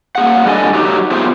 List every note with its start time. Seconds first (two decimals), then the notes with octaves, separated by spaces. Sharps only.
0.15 A#3 G#4 F#5
0.46 G2 G3 D4 A4 D#5 G#5
0.74 F#3 D#4 G4
1.11 A3 B3 F4 G4 G#4 C5